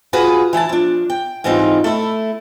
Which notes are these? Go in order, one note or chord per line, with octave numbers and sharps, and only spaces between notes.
F4 F#4 G#4 B4
E3 E4 G5 A5
F3 D4
G5
G#2 E3 G3 C4 D#4 F4
A3 E4